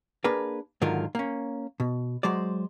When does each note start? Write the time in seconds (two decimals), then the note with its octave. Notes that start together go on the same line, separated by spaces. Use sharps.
0.24 A#3 D4 G#4 A#4 B4
0.81 G#2 D3 D#3 F#3 F4 A#4
1.15 A#3 C#4
1.80 B2
2.23 F#3 G#3 C5 D5